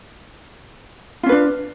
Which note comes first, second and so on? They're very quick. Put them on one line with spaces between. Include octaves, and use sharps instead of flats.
F4 C#4 B4 D4